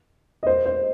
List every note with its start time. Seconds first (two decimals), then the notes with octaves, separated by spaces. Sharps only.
0.43 D#5
0.47 C5
0.66 C5